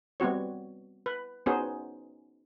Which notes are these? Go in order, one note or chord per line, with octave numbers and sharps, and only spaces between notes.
G3 B3 C4 F#4 C#5
B4
B3 C#4 D#4 F#4 G#4 C5